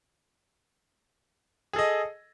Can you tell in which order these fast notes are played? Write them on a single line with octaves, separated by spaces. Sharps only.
G#4 A4 D#5